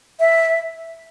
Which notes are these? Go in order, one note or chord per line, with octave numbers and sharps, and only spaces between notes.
E5